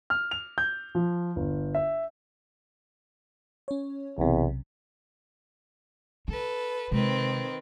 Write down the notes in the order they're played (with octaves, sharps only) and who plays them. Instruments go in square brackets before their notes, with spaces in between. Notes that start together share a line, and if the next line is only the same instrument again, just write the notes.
[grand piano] F6
F7
G6
F3
G1
E5
[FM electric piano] C#4 C#5
[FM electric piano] B1 C3 [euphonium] E2
[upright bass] D#4 [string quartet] A4 B4
[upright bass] C3 G#3 [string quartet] D#3 C4 B4